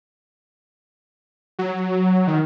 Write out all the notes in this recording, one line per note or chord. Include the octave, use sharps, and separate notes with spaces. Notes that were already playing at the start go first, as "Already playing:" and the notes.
F#3
D#3